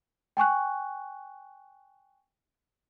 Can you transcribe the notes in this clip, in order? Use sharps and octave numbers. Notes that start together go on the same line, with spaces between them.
G5 G#5 C#6 F#6